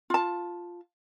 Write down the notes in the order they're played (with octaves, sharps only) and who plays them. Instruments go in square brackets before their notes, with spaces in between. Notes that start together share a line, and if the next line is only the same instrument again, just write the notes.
[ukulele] F4 A5